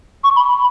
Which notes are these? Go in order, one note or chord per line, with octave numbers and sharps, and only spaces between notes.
C#6
B5